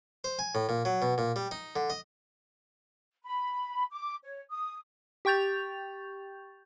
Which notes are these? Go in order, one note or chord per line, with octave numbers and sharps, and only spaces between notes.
C5
G#5
A2
A#2
F#3
B2
A#2
G3
D#4
D3
D#5
B5
D6
C#5
D#6
G4 G5 C#6 G6 A6 F7